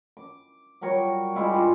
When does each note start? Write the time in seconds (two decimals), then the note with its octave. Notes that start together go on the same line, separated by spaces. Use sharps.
0.17 D6
0.81 F#3 G3 A#4 C#5
1.35 G3 G#3 E4 F4
1.54 G2